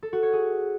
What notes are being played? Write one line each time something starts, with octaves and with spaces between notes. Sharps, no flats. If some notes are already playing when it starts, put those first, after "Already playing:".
A4
F#4
C#5
G#4